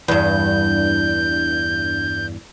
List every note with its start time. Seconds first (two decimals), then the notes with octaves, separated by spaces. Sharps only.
0.08 E2 G2 G6